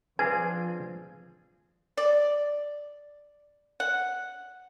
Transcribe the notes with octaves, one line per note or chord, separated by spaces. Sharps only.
F3 C4 D4 G#4 B4 G#5
D5
F#5